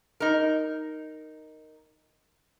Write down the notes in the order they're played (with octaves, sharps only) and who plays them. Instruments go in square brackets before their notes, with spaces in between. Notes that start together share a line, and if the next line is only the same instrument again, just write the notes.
[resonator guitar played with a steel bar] D#4 A#4